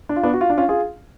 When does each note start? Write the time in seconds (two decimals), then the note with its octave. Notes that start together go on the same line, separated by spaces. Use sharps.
0.09 D4
0.16 F4
0.23 B3 D4
0.33 F#4
0.41 F4
0.50 D4
0.57 C#4 F4
0.69 F4 G#4